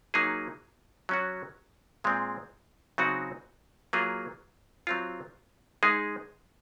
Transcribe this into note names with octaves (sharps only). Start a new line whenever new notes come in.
F#3 A#3 D#4 G#4
F#3 C#4 F#4
A#2 G#3 C4
C#3 F#3 C4 D#4 F#4
F#3 A#3 F4 G#4
F#3 C4 F4
G#3 D#4 G#4